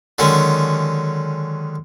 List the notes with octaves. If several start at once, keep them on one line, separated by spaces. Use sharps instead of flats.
D3 D#3 F#3 G#3 C#4